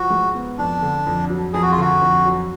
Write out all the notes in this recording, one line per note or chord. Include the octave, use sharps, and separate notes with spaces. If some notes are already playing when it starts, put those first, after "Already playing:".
Already playing: F3 F#4
G#2
B3
F2 D4
D3
F2
F#3
F2 G#4
F#4
F4
D3 F#4
F2
F#3